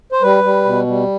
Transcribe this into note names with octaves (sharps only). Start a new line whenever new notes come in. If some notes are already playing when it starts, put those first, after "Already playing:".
C5
G3 B4
G3
B2
G3